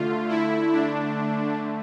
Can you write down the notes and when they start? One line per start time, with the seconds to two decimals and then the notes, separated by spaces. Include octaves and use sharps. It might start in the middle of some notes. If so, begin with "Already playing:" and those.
Already playing: D3 A3 F4
0.28 E4
0.72 D4